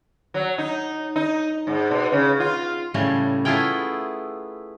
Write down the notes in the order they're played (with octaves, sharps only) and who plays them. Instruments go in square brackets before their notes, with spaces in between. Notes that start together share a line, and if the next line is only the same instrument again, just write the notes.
[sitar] F#3
D#4
D#4
G#2
B2
C#3
F4
[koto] A2 C#3 G3 A3
A3 B3 E4 F4 G#4 G5